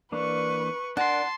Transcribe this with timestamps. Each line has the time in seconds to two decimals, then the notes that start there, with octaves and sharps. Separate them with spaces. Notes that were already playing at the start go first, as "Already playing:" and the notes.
0.12 E3 A#3 D4 B4 C#6
0.97 D4 A#4 F#5 A5 C6